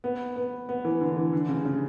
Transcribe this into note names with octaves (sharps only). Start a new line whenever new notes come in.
B3
B3
B3
E3
D3
E3
D3
C#3
C#3